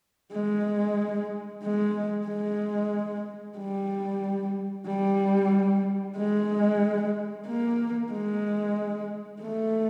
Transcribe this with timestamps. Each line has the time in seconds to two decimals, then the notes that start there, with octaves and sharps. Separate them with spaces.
0.33 G#3
1.63 G#3
2.27 G#3
3.58 G3
4.87 G3
6.17 G#3
7.47 A#3
8.12 G#3
9.42 A3